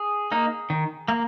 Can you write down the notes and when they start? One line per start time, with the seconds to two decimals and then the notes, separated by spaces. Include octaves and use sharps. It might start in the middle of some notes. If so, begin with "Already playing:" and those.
Already playing: G#4
0.32 A#3 D#4
0.70 D#3
1.08 A#3